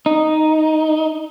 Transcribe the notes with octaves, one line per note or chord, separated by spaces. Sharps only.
D#4